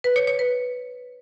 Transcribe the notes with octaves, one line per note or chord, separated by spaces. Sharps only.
B4
C#5
C#5
B4